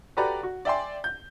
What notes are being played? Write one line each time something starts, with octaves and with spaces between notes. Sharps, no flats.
F#4 G4 A4 B4 D5 A#5
F#4
D5 E5 G5 G#5 C6
G6